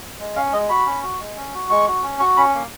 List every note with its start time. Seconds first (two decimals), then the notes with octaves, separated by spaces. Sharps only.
0.20 G#3
0.35 C#4 F5
0.53 G#3 D#5
0.69 F#4 B5
0.86 C#4
1.03 F#4
1.20 G#3
1.36 C#4
1.54 F#4
1.70 G#3 C#6
1.88 F#4
2.03 C#4
2.20 F#4 C#6
2.37 C#4 B5
2.54 A#3